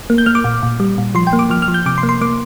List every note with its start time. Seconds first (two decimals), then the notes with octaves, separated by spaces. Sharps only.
0.10 A#3
0.18 G6
0.26 A#3 F6
0.35 D6
0.44 A#2
0.63 A#2
0.80 G3
0.98 A#2
1.15 F3 C6
1.27 G5
1.33 A#3
1.39 D6
1.50 F3 F6
1.62 F6
1.68 F3
1.74 G6
1.86 C3 D6
1.98 C6
2.03 A#3
2.09 C6
2.21 A#3 D6